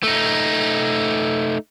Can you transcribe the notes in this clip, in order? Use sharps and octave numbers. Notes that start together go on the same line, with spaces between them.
A3 D#4